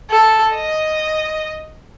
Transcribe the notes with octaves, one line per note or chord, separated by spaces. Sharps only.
A4
D#5